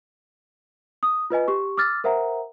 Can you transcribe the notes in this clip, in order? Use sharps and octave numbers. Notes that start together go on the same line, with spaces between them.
D#6
F4 B4 D#5 G#5
G4 C#6
D6 E6 F6 A6
A#4 C5 E5 F#5 A#5